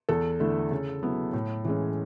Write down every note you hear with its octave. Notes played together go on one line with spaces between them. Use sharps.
E2 A4
D3 A3 E4
C#3
F#3 B3 E4
A2
E3 G#3 C#4